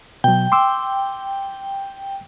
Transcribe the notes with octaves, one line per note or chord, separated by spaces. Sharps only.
B2 F#3 G5
C6 D6 E6